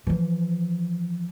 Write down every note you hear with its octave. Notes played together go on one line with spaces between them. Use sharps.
E3 F3